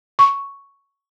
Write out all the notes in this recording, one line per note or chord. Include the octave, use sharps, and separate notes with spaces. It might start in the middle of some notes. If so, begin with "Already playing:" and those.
C#6